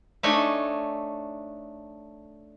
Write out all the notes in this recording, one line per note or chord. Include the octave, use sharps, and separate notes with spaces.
A3 D4 D#4 C#5 G#5